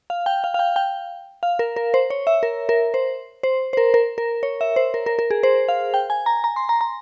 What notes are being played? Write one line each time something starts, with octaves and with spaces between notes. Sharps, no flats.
F5
G5
F5
F5
G5
G5
F5
A#4
A#4
C5
C#5
E5
A#4
A#4
C5
C5
C5
A#4
A#4
A#4
C#5
E5
C5
A#4
A#4
A#4
G#4
C5
F5
G5
G#5
A#5
A#5
C6
A#5
A#5